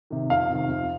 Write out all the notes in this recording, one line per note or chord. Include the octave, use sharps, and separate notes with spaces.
C3 D#3
F2 F5
C3 D#3
F2